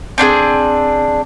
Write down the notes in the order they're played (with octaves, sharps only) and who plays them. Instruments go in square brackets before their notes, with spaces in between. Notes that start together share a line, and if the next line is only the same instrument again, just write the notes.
[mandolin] C4 D4 F4 G#4